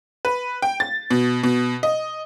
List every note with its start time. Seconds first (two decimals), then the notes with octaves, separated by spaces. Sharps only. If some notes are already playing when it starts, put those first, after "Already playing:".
0.25 B4
0.62 G5
0.80 A6
1.11 B2
1.43 B2
1.83 D#5